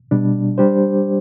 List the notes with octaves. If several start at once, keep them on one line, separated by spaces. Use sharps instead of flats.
B2 G3 D4
G3 D4 G4 C5